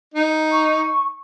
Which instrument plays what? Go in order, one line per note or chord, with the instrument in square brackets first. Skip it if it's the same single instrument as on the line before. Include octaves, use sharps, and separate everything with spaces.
[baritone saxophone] D#4
[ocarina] C#6